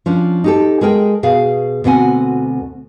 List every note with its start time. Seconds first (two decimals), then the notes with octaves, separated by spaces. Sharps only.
0.06 F3 C#4 D4
0.44 D#4 G4 A4
0.81 G#3 G#4 A#4 G5
1.23 B2 G#4 F5
1.84 D2 B2 C4 F#5 G#5